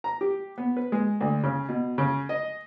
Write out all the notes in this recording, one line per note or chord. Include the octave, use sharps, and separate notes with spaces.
A#5
G4
B3
B4
G#3
D2
C#3
B2
C#3
D#5